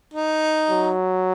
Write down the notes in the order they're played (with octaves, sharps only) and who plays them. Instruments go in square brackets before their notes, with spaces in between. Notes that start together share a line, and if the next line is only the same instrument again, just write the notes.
[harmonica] D#4
[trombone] F#3